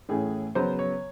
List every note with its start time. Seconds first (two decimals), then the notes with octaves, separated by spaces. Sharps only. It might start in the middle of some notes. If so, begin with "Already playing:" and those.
0.09 A2 E3 A3 C#4 G#4
0.55 C#3 F#3 B3 C5
0.79 C#5